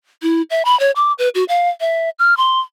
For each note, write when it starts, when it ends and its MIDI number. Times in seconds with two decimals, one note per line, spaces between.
0.22 0.42 64
0.50 0.65 76
0.65 0.78 83
0.80 0.91 73
0.96 1.13 86
1.19 1.29 71
1.35 1.44 66
1.49 1.69 77
1.81 2.10 76
2.19 2.37 89
2.37 2.60 84